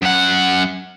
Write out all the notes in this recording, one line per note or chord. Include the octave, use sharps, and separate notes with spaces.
F#2 F#5